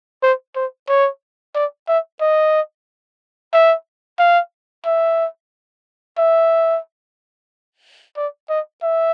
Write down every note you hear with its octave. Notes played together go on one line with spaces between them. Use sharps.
C5
C5
C#5
D5
E5
D#5
E5
F5
E5
E5
D5
D#5
E5